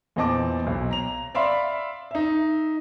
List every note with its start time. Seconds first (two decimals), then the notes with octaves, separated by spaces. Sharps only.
0.16 E2 A#2 C4 D#5 A5 D6
0.67 B1
0.91 A#5 F7
1.35 D5 E5 F5 B5 C6
2.11 D#4 E5